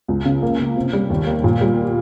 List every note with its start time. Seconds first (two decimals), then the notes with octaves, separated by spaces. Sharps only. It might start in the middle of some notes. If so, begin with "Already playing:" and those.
0.08 C#2
0.25 C#3
0.42 A#3
0.59 C#3
0.76 C3
0.93 G3
1.10 D#2
1.27 A#3
1.44 A#2
1.61 G3